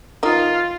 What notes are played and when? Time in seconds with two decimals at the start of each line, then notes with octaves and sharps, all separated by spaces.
0.23 D#3 D#4 F4